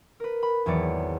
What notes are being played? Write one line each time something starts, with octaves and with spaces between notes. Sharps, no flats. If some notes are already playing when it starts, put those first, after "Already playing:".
A#4 B4
B5
G#1 E2 E3 F#3 D5 C#7